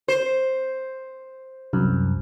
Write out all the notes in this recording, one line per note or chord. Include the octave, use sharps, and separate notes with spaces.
C5
C2 F#2